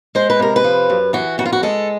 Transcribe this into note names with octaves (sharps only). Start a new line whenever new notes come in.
G#3 C5
B4
C3 A#4
B4
F3
F#2
E3 F#4
F2 F#4
F4
F#4
G#3 A4